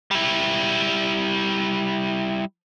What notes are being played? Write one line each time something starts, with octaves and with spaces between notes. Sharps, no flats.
G3 E4